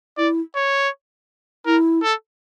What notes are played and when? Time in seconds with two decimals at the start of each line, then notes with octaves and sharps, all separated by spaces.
0.17 E4 D5
0.56 C#5
1.66 E4 A#4
2.03 A4